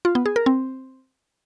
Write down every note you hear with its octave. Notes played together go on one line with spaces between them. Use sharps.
F4
B3
G#4
A#4
C4